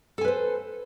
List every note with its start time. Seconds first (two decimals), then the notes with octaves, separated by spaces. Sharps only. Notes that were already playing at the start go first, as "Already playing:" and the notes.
0.18 A4
0.21 G#5
0.25 B4
0.28 C5